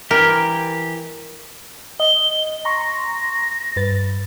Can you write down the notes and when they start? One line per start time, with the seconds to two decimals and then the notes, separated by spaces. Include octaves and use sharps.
0.11 E3 G4 A#4
2.00 D#5 G7
2.65 A#5 C6 C#6 A#6
3.76 G2 B4 A6